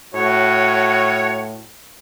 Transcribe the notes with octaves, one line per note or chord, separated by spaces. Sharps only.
A2 F#4 C#5